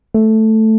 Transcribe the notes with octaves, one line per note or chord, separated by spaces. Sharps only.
A3